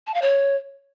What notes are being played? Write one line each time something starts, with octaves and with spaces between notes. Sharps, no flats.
A5
F5
C#5